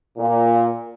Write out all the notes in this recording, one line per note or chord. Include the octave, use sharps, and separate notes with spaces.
A#2